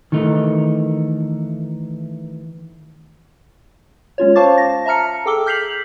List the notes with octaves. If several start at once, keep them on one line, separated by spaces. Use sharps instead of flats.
D#3 E3 A3 D#4
G#3 C#4 F4 C#5
C5 F5 A5 C#6 D6 A6
A#6
E5 A5 A#5 F6 C#7
G#4 A4 G5 D6 E6 G7
F6 G6 B6 C7 F7 F#7